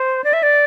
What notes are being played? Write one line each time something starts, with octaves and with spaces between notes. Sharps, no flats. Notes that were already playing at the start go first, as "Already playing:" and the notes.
Already playing: C5
D5
E5
D5